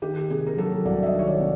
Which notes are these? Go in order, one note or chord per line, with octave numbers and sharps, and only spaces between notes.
D#3 G4
C3 G#4
A#4
F#3 A4
C2 D5
E5
D#5
D#3
C#5
D5
C3